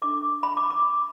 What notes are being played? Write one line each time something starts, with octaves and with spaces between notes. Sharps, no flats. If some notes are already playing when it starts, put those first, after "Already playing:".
D4 A4 D6
B5
D6
D6